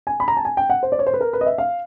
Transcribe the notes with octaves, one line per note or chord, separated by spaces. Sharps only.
G#5
B5
A#5
A5
G#5
G5
F#5
C5
D5
C#5
C5
B4
A#4
B4
D#5
E5
F5